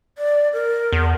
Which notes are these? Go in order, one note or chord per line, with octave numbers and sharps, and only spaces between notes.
D5
A#4
E2